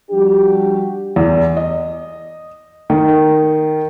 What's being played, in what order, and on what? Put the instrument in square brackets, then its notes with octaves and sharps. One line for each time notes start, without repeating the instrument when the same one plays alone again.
[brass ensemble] F3 G3 D4 F#4 G4
[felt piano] E2
D#5
D#3